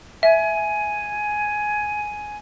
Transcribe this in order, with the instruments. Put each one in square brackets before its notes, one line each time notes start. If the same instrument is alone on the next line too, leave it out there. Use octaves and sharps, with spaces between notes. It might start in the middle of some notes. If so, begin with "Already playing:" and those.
[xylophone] E5 [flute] G#5